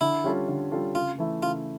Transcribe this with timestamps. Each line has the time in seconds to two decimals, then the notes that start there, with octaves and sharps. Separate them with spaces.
0.01 D3 E4
0.24 G3 C#4 F4 A4
0.48 D3
0.72 G3 C#4 F4 A4
0.95 C#3 F4
1.18 E3 A3 E4
1.42 C#3 F4